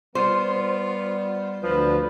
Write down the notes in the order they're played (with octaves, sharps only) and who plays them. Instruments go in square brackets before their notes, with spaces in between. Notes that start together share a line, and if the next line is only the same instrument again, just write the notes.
[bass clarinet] G3 [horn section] B3 F4 [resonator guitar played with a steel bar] C5
[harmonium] D2 B4 [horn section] D3 E3 F3